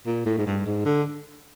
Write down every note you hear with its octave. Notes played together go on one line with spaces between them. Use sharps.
A#2
A2
G#2
G2
G#2
D3